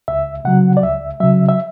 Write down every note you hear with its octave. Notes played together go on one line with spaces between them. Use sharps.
C#2 E5
C#3 F#3 F#5
D5
C#2 E5
C#3 F#3 E5
E5